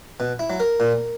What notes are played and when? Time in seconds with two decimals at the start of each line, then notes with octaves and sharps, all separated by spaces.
0.20 B2
0.39 E4
0.50 F#3
0.60 A#4
0.80 A#2